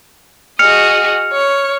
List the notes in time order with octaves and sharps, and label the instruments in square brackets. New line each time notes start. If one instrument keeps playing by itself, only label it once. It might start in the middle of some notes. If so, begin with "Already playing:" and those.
[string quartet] F#4 G#4 D#5 [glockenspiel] F6 C#7 F7
[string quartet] C#5